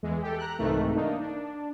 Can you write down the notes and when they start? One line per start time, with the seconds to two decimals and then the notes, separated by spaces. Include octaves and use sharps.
0.03 E2 E3 G#3
0.22 G4 A4
0.38 A#5 F#6
0.59 C2 G#2 C3 D#3 E3 A3
0.94 A#3 D4 D#4
1.20 D4